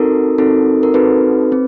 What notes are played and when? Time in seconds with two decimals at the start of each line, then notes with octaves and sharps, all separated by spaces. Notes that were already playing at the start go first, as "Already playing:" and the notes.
Already playing: C4 D#4 F#4 A4 A#4
0.38 C4 D#4 F#4 A4
0.83 A#4
0.94 C4 D#4 F#4 A4 B4
1.52 C4